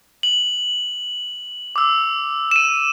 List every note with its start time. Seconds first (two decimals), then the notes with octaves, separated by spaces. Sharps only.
0.23 F#7
1.76 D6 E6
2.51 D#7 E7